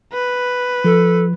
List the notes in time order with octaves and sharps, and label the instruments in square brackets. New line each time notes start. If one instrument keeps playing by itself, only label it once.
[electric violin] B4
[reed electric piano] F3 [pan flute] A4